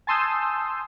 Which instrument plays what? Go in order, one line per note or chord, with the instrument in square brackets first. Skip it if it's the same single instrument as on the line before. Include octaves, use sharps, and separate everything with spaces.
[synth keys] G#5 A5 C6 D#6 E6 G6